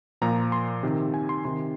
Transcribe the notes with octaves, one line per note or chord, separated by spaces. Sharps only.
A#2 F3 A#5
C6
C3 D#3
G#5
C6
C3 D#3 C6